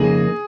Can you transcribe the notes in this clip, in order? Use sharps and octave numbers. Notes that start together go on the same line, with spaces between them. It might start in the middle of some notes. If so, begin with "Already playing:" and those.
Already playing: F2 C#3 A#3 D#4 G#4 A#4